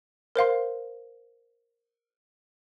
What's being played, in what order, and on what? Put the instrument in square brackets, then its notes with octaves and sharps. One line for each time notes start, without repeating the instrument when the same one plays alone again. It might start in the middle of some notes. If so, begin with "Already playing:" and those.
[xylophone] A#4 C5 F5 C6